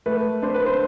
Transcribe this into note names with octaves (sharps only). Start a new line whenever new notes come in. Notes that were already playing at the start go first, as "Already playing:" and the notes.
A3 B4
D4 C5
B4
C5